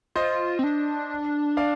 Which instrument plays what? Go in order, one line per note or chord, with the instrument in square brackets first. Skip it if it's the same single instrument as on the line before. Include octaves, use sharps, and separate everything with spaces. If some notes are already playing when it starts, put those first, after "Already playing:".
[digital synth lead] F4 [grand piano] C5 D#5
[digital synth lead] C4
D4
[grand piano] D5 F5